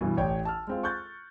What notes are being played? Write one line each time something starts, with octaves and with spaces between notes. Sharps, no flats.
G2 B2 E3
A1 C#5 D5 G5
A5 E6 F6
G#3 C4 F4
C#6 F#6 G6 A6